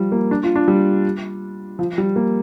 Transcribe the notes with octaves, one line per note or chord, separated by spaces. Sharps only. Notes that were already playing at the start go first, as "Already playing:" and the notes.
Already playing: F3 G3
A#3
D4
F4
D4
G3
F3
G3
A#3